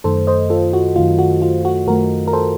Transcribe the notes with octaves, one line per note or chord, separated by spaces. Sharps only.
F#2 D#3 A3 A4 C5
C5 D#5
F4 A4
F#4
F#2 D#3 A3 F4
F#4
F4
F#4
F#2 D#3 A3 F#4 A#4
A#4
A4 C5